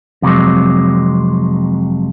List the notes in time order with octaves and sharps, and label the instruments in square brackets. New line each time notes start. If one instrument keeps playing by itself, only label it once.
[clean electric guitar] F2 C3 F3 F#3 G#3